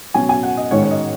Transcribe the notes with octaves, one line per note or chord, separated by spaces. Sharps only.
B2 F#3 C#4 G#5
G#5
F#5
D#5
G#2 D#3 G#3 C#4 C#5
C#5
D#5